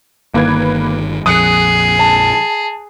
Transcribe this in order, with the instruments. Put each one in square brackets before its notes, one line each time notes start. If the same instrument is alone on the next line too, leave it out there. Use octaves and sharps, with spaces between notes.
[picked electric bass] G1 D#3 [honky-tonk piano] A#3 B4 G#6
[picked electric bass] A#1 F2 [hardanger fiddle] G#4 [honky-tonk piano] D#6 F#6 C#7
[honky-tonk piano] A5